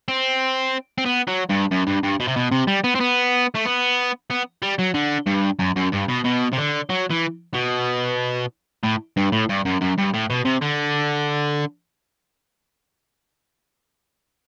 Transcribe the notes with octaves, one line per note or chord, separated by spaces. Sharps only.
C4
C4
B3
F#3
G2
F#2
G2
G2
B2
C3
B2
C3
G3
B3
C4
B3
A3
B3
B3
G3
F#3
D3
G2
F#2
F#2
G2
B2
B2
C3
D3
F#3
E3
B2
A2
G2
A2
G2
F#2
F#2
G2
A2
B2
C3
D3